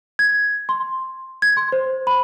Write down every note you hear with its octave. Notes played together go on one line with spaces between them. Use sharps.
G#6
C6
G#6
C6
C5
B5